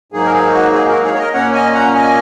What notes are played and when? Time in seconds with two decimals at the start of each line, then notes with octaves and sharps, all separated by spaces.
0.12 G#2 F#3 A#3 D#4 G#4
0.26 A#4
0.33 G#4
0.52 F#4
0.73 G#4
0.88 F#4 A#4
1.04 G#4 C#5
1.14 C#5
1.18 A#4 D#5
1.33 A#2 A#3 C#4 C#5 F#5
1.54 D#5 G#5
1.74 F#5 A#5
1.94 D#5 G#5